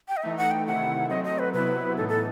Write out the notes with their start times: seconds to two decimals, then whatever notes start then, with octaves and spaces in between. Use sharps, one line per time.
0.08 G5
0.17 D#5
0.23 E3 A3 D#4 E5
0.37 F#5
0.51 G5
0.67 C3 D#3 A3 E4 F#5
1.09 F#3 A3 C4 D#5
1.24 D#5
1.39 B4
1.53 C3 F#3 B3 E4 B4
1.97 A2 E3 B3 D#4 A4
2.09 A4